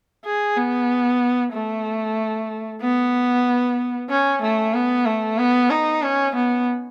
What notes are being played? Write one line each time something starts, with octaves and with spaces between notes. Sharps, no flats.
G#4
B3
A3
B3
C#4
A3
B3
A3
B3
D#4
C#4
B3